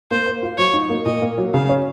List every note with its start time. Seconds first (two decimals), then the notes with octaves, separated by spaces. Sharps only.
0.11 A#3 C5
0.26 C5
0.43 F4
0.58 F#3 C#5
0.74 D#4
0.90 A#3
1.05 A#2 D#5
1.22 A#3
1.38 F#3
1.54 C#3 F5
1.69 C#4